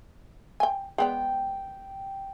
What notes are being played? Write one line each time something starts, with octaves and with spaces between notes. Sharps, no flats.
G5 G#5
G#3 B3 D5 G5